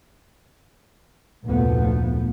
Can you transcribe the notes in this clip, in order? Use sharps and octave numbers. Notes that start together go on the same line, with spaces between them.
F1 D2 A#2 F3 A3 B3